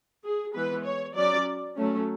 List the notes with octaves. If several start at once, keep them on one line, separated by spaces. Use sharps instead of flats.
G#4
E3 G#3 B3 B4
C#5
F#3 C#4 D5
F#3 A3 C#4